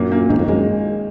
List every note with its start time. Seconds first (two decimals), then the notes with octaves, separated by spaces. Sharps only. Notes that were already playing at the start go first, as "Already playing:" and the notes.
Already playing: F#2 A#2 A#3
0.12 A#3
0.29 G#2 D#3
0.39 F2
0.48 F#2 G#3